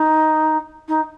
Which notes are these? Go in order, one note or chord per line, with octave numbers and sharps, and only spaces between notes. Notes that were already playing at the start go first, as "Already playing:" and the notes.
Already playing: D#4
D#4